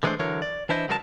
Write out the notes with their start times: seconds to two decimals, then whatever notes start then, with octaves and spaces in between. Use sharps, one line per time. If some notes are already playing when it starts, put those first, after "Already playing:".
0.03 D3 E3 G#3 A3 D4 C5
0.19 D3 E3 F#3 A#4 C#5
0.42 D5
0.69 E3 D4 E4 C5 D#5
0.88 C#2 F#3 G#3 A#4 C#5 A5